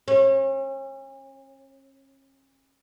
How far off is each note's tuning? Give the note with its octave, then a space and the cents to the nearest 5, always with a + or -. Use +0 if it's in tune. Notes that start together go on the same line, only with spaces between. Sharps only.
C#4 -40